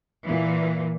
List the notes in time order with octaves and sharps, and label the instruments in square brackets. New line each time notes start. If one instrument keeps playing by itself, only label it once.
[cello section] A#2 E3